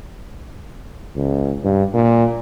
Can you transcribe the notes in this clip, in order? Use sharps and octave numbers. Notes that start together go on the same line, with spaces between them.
C#2
G2
A#2